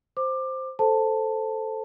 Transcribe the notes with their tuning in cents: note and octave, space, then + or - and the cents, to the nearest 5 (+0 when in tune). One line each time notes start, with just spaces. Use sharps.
C5 +0 D6 +20
A4 +0 C5 +0 A5 +10